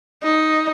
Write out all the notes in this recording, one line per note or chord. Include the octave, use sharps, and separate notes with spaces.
D#4